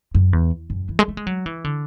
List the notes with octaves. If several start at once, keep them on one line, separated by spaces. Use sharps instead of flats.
F#2
E2
F#2
E3
G#3
A3
G#3
F#3
E3
D3